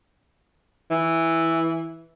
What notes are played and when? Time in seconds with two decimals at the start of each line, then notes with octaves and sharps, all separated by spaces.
0.91 E3